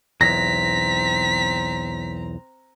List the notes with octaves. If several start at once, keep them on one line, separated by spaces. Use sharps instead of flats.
B1 E2 C4 A#5 A#6 B6